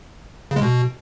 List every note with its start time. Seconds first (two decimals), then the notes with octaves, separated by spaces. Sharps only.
0.51 C#3
0.56 G#3
0.61 B2